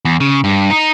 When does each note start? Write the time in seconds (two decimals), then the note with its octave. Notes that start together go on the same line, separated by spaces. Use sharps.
0.05 E2
0.20 C#3
0.44 G2
0.70 D#4